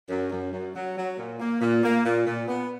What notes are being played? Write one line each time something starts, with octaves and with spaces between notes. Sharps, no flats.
F#2
F#2
F#2
F#3
F#3
A#2
A#3
A#2
A#3
A#2
A#2
B3